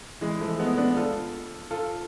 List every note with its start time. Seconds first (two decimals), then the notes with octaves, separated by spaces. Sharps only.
0.21 E3 G#3
0.41 F3 A3
0.59 G#3 B3
0.77 B3 D4
0.97 F4 A4
1.71 F4 A4